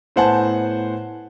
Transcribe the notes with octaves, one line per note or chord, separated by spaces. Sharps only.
A2 B3 C5 F#5 G#5 A5